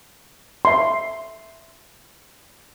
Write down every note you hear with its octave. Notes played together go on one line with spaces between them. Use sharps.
E5 C6